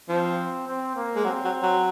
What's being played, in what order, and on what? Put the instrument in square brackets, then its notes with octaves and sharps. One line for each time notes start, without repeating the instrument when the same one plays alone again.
[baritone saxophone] F3 [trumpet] C4
[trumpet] C4
A#3
[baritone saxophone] G#3
[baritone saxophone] F#3 [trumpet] C4
[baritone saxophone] F#3
F#3